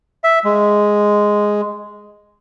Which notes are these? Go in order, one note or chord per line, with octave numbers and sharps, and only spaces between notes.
E5
G#3